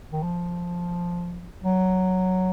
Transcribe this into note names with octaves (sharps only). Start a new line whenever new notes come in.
D#3
F3
F#3